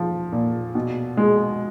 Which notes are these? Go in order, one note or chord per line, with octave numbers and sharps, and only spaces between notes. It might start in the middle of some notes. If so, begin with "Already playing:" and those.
Already playing: F3
A#2
B2
G#3